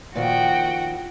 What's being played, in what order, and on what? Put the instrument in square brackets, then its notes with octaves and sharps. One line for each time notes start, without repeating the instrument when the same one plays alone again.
[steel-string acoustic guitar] A#2 D#3 F3 [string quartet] F#4 G5